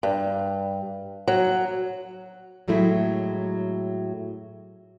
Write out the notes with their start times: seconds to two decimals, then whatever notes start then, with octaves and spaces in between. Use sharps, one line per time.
0.03 G2
1.28 F#3
2.68 A2 F#3 G#3 A3 E4